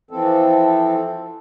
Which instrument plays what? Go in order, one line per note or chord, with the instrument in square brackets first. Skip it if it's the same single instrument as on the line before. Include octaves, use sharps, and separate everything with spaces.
[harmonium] E3 F3 C4 A4